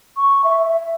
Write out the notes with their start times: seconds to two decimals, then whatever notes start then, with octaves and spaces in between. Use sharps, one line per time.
0.17 C#6
0.44 E5
0.69 E5